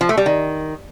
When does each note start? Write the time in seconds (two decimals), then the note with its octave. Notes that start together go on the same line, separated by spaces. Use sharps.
0.01 F3
0.09 A3
0.17 G3
0.26 D#3